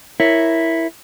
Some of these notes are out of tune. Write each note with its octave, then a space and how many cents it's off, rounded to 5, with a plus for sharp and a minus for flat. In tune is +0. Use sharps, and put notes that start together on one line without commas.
E4 +0 A#4 +0 C#5 +0